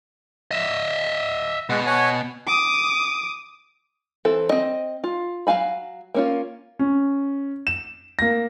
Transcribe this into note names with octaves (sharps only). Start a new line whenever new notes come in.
D#5 E5
B2 G#3 F#5
C#5 F#5 G#5
D6 D#6
E3 C4 A4
C4 D#5
F4
F#3 D4 F5 G#5 B5
A#3 C#4 F4
C#4
E7
A#3 A#6